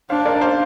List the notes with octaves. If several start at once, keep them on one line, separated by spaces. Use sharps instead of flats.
D4 C5 F5
A#4 D5
C5 F5